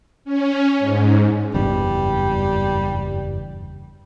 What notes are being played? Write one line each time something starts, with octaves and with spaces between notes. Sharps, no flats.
C#4
G#2
F#1 E2 G2 G3